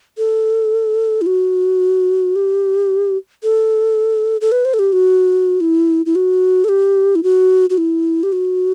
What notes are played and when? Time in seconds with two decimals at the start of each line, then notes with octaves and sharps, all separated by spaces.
0.18 A4
1.21 E4
1.26 F#4
2.36 G4
3.43 A4
4.41 A4
4.52 B4
4.65 C5
4.74 A4
4.79 G4
4.93 F#4
5.61 E4
6.06 E4
6.15 F#4
6.64 A4
6.69 G4
7.15 E4
7.23 F#4
7.70 F#4
7.78 E4
8.23 G4
8.32 F#4